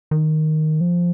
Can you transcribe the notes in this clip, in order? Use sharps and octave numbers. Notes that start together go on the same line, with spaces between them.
D#3
F3